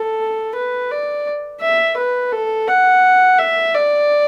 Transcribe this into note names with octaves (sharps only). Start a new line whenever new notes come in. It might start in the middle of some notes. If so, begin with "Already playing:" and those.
Already playing: A4
B4
D5
E5
B4
A4
F#5
E5
D5